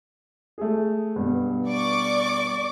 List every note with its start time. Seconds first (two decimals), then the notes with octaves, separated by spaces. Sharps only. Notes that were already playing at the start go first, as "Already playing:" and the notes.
0.58 A3 G#4
1.16 G2 B2
1.68 D5 C#6 D6